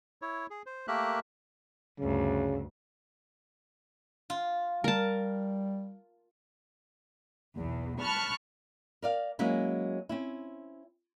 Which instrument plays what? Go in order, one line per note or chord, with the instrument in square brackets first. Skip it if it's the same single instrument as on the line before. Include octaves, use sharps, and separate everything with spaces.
[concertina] E4 C#5
G#4
C5
A3 A#3 G4 A#4 E5 F#6
[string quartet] D2 G2 [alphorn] C#3
[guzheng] F4
[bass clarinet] G3 [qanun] A#4 A5
[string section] B1 E2
A5 B5 C#6 F6 F#6
[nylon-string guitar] A#4 D5 F5
F#3 G#3 A#3 C#4 E4
C4 C#4 E4